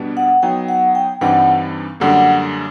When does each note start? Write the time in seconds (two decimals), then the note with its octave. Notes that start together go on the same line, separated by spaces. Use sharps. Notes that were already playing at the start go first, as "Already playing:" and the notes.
Already playing: B2 G3 B3 D4
0.17 F#5
0.43 F#3 B3 D#4 G5
0.69 F#5
0.95 G5
1.21 G2 E3 G3 C4 D#4 F#5
2.00 F#2 D3 G3 A#3 F#5